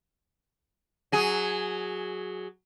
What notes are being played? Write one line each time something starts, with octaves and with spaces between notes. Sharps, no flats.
F#3 G#4